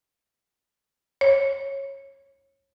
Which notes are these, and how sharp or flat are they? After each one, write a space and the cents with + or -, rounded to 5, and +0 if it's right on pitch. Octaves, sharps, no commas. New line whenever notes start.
C#5 -20